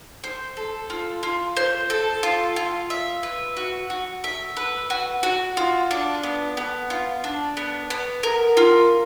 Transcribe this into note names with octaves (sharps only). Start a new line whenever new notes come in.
C5
A4
F4
F4
C5
A4
F4
F4
E5
B4
F#4
F#4
E5
B4
F#4
F#4
F4
D4
B3
B3
F4
D4
B3
B3
A#4
F4